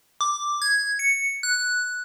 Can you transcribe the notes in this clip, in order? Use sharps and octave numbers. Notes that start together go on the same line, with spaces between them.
D6
G#6
C#7
F#6